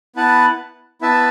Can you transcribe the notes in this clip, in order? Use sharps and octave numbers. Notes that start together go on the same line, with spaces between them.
B3 E4 B4 F#5 A5
B3 E4 B4 E5 A5